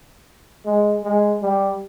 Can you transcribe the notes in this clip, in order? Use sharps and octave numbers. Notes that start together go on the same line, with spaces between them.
G#3
G#3
G3